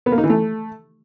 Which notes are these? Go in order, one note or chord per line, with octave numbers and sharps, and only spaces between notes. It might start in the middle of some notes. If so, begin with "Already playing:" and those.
B3
A#3
D#4
E3
A3